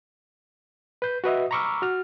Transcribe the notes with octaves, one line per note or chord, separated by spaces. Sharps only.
B4 G6
F#4 B4 D#5 E5
A#5 B5 C#6 D6 E6 F6
F#4 F6